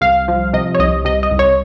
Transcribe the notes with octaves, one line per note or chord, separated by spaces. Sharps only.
C2 F5
F3
C3 D#5
C#5
C2 D#5
C3 D#5
D#5
C2
C#5